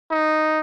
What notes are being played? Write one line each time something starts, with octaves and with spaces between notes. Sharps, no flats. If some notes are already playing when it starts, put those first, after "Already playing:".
D#4